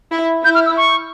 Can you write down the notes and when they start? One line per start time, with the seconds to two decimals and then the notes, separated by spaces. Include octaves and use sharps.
0.12 E4
0.44 E4 G6
0.55 F6
0.66 E6
0.77 C#6